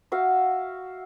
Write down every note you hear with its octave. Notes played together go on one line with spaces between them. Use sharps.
F#4 E5 F5